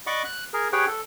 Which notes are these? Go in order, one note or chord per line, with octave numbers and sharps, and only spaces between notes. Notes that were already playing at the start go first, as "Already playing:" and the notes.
D5 D#5 F#5 B5 C#6 D6
F#6
G#4 A#4
G4 G#4 B4 C#5 F#5 G5
A4